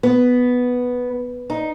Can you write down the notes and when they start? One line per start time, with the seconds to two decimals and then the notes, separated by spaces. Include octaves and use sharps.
0.03 B3
1.50 D#4